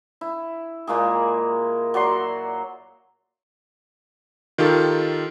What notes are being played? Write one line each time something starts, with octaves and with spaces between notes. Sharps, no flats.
E4
A#2 G#3 A#3 G#4
F#3 D5 F#5 C6
D#3 F4 G4 A4